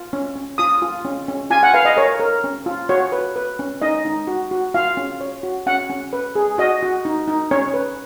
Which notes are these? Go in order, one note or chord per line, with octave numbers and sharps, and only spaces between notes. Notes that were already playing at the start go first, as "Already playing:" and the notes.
Already playing: F4
C#4
C#4
F4 D#6
F4
C#4
C#4
F4 G#5
F#5
B4 F5
D#5
A#4 C#5
A#4
C#4
F4
F#4 C#5
B4
B4
C#4
D#4 D#5
D#4
F#4
F#4
F4 F5
C#4
C#5
F#4
C#4 F#5
C#4
B4
G#4
F#4 D#5
F#4
D#4
D#4
C#4 C#5
B4